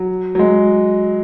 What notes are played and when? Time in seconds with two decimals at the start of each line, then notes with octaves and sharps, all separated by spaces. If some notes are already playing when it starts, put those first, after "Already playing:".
Already playing: F#3
0.35 F#3
0.39 G#3